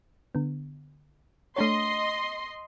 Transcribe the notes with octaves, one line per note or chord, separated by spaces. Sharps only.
D3 B3
A3 D4 C#5 D#5 C6